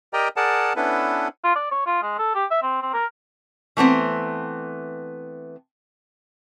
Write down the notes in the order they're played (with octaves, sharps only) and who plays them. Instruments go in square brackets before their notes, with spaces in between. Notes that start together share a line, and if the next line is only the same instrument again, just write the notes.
[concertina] G4 A#4 D5 D#5 G5 A#5
G#4 A#4 D5 F#5 A5
B3 C#4 D4 E4 A4 B4
[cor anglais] F4
D5
C#5
F4
G#3
A4
G4
E5
C4
C4
A#4
[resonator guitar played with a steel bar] E3 A3 B3 C4